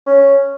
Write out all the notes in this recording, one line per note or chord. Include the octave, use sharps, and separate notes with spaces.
C#4